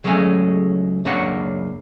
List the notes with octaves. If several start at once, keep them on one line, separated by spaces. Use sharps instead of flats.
C#2 F#3 G#3 A3 C#4 G#5
C#2 F#2 A#3 D4 C#5 F#5